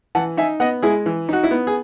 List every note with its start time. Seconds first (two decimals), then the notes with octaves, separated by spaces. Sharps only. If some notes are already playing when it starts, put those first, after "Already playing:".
0.15 E3 F#5 A5
0.37 D#4 E5 G#5
0.60 B3 D#5 F#5
0.82 G#3 E4 G#4
1.06 E3
1.29 D#4 F#4
1.44 E4
1.51 B3
1.67 G#4